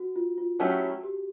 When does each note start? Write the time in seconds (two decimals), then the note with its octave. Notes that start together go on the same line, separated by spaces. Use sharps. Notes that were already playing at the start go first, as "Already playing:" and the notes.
Already playing: F#4
0.16 F4
0.38 F4
0.59 F#3 A3 C#4 E4 F#4 G4
1.03 G4